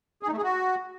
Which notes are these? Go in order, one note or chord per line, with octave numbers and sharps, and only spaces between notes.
G#4
D#4
A3
G#4
F#4